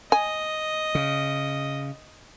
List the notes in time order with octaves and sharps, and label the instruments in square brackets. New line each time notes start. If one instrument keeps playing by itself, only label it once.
[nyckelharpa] D#5 [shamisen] G#5
[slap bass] C#3